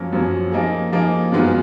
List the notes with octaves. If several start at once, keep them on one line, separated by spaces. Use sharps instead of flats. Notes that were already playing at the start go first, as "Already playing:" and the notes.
Already playing: F#2 F3 A#3 C#4
F#2 F3 A#3 C#4
F3 A#3 D#4 G#4
F3 A#3 D#4 G#4
F#2 D#3 G#3 B3 F4